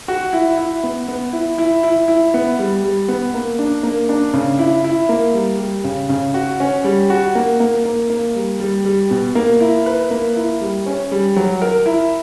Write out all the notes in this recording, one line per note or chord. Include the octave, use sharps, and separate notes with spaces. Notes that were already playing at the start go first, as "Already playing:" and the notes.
F#4
E4
E4
B3
B3
E4
E4
E4
E4
B3
G3
G3
B3
A#3
D4
A#3
D4
C#3
E4
E4
A#3
G3
G3
C#3
C#3
F#4
C#4
G3
F#4
A#3
A#3
A#3
A#3
G3
G3
G3
B2
A#3
E4
B4
A#3
E4
G3
C#4
G3
F#3
A#4
E4